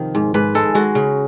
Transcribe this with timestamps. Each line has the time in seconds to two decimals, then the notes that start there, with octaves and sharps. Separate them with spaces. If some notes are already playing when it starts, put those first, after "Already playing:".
Already playing: C3 D#3 F3
0.15 G#2
0.34 G#2 B4
0.55 G#3 A4
0.75 G#3 F#4
0.95 C#3